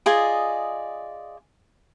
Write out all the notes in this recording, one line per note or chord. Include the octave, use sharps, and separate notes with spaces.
F4 G#4 D5 D#5